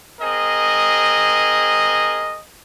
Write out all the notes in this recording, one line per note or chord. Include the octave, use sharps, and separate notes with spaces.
C4 G#4 A#4 D#5